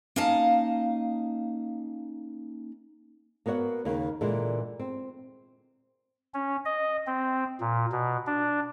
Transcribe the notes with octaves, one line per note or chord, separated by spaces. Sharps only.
A#3 C#4 D#4 D#5 F5 A5
A#3 B3 F#4 C#5 F#5
D#2 C#3 A#3
A#2 D3 E3 G#3
C4
C#4
D#5
C4
A#2
B2
D4